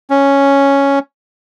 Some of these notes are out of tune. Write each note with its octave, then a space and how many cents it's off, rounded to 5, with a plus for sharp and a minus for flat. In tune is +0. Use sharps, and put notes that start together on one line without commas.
C#4 +0